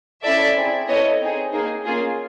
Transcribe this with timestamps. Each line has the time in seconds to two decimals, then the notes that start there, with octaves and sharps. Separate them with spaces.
0.23 C#4 E4 A4 D5 E5
0.55 C4 E4 G#4
0.87 B3 E4 A4 C#5 D#5
1.20 C4 D#4 G#4
1.52 A#3 D#4 G#4
1.85 A#3 C#4 F4 G#4